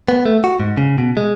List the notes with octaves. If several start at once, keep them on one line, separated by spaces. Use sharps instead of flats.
B3
A3
F#4
G#2
C#3
B2
G#3